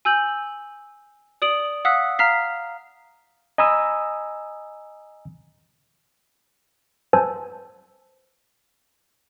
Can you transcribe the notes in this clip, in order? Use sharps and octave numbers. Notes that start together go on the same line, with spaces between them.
G#5 E6 G6 F#7
D5 D#6 D7 F#7
F5 F#5 D#6 E6 F#6 B6
F5 A#5 F6 B6 C7
D#5 G#5 A#5 B5 D#6 E6
B4 C5 G#5 A5 E6